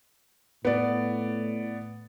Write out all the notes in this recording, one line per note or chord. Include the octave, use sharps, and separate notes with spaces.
A2 B3 D5